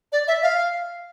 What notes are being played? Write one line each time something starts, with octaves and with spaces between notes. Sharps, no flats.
D5
E5
F5